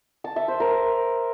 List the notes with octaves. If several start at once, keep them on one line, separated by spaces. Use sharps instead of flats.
A5
E5
C5
A#4